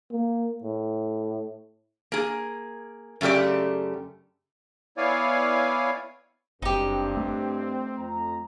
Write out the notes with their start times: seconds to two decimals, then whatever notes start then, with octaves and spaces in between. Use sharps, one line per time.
0.12 A#3
0.64 A2
2.12 A#3 G#4
3.21 F#2 C#3 A3 G4 D5
4.97 B3 E4 C#5 D5 F5 G#5
6.62 F#1 G2 C4 D#4 G4
7.17 A3
7.98 F2 A#5